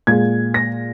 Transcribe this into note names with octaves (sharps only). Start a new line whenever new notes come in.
A#2 G#3 G#6
A#6